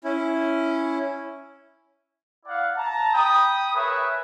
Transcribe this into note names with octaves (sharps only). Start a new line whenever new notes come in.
C#4 E4
E4 D5 F5 F#5
A5 A#5
G5 B5 D#6
G#4 A#4 B4 C#5 E5